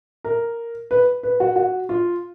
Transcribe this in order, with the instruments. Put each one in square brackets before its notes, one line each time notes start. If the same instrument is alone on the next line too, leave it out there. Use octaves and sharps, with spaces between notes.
[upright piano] A#4
B4
B4
F#4
F#4
F4